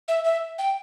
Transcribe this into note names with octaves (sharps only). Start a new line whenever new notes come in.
E5
E5
G5